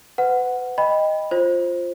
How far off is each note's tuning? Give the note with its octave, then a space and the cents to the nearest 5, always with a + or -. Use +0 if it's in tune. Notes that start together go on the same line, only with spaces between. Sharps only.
B4 +35 F#5 +0
D#5 +0 G5 +20 B5 +0
F4 +0 C5 +10